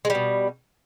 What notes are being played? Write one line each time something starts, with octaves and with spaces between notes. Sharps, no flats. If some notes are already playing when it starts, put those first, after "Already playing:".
B2 G3 G#3